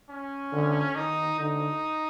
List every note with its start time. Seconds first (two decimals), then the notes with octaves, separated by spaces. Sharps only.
0.10 C#4
0.52 D3
0.95 D#3 D#4
1.38 D3 D#4